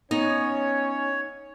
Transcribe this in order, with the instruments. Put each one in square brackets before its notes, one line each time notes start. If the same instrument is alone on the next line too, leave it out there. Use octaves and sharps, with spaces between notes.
[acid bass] B3 [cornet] C#4 [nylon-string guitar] D#4 [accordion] C#5